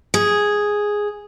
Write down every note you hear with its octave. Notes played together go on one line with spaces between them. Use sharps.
G#4